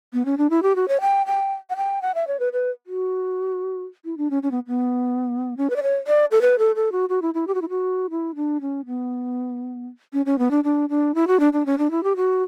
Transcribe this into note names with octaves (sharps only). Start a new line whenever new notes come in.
B3
C#4
D4
E4
G4
F#4
C#5
G5
G5
F#5
G5
F#5
E5
C#5
B4
B4
F#4
E4
D4
C#4
C#4
B3
B3
C#4
B4
D5
C#5
D5
A4
B4
A4
A4
F#4
F#4
E4
E4
G4
F#4
E4
F#4
E4
D4
C#4
B3
C#4
C#4
B3
D4
D4
D4
E4
F#4
D4
D4
C#4
D4
E4
G4
F#4